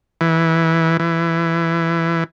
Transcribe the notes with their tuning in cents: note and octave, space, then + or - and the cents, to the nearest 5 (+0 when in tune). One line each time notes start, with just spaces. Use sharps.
E3 -10
E3 +15